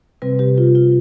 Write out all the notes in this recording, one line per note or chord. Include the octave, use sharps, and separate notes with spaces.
C3 G3 C4 B4
G4
F4
F4